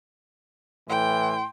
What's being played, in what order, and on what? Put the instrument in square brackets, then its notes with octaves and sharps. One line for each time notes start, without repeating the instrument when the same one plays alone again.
[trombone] A2 [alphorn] E3 [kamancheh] G5 [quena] C6